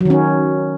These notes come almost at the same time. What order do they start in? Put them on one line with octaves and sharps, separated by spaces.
F#3 D#3 C#4